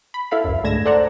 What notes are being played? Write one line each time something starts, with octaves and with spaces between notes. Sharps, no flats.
B5
E4 A4 F5 B5
C#2 F#2
G#2 D3 A3 G#6 A#6 E7
A4 C5 D5 F#5 A#5